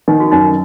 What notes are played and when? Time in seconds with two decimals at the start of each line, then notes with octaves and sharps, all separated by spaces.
0.08 D#3 D#4
0.20 F#4
0.32 F#2 D#4